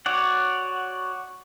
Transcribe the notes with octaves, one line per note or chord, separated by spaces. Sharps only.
F#4 C#5 D5 F#5